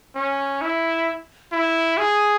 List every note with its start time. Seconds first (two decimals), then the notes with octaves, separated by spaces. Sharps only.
0.15 C#4
0.61 E4
1.52 E4
1.97 G#4